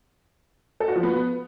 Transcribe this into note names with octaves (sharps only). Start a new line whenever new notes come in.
A4
F#4
F3
B3